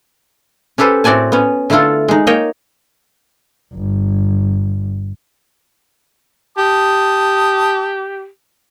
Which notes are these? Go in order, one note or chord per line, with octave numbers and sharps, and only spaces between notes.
C#4 G4 A4 B4 C5
A2 C4 F#4 D5 G#5 A5
B3 C#4
D3 A3 E4 F4 A4
G#3 D#4
A#3 D#4 C#5 D#5 G5
G1
G4 A5 D#6